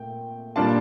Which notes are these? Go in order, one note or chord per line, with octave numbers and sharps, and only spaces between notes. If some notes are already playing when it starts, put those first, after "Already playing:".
Already playing: A#2 A3 G5
A#2 G3 A#3 D4 F4 A5